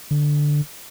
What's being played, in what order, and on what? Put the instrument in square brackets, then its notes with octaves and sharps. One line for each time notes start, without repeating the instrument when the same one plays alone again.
[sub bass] D3